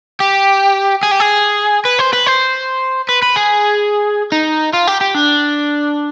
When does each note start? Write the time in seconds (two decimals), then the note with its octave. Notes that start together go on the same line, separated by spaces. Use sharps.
0.20 G4
1.03 G#4
1.11 G4
1.20 G#4
1.85 B4
1.99 C5
2.13 B4
2.26 C5
3.09 B4
3.22 B4
3.36 G#4
4.32 D#4
4.73 F4
4.87 G4
5.01 G4
5.15 D4